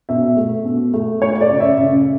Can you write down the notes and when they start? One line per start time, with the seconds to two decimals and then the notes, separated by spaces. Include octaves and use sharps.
0.09 B2 E5
0.37 A3
0.65 B2
0.94 A3
1.22 A3 C#5
1.41 D5
1.51 C#3
1.60 E5
1.79 C#3